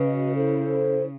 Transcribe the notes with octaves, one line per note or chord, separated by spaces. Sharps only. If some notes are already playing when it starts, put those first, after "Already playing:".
Already playing: C#3 F#4 B4 D#5
E4 A4 C5